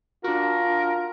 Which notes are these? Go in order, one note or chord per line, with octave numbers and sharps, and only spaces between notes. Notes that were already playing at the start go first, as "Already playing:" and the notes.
D4 F4 F#4 A#4